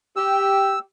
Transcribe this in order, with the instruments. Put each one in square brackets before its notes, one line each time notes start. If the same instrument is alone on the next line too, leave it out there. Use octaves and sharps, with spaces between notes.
[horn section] G4 [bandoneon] E6